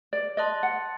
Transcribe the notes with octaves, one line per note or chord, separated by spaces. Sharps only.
D5
D#5 A5 C6 D#6 F#6 A6
F#5